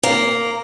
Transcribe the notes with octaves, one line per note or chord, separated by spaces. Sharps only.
A#3